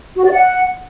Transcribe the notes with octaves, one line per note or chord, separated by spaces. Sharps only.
F#4
D5
F#5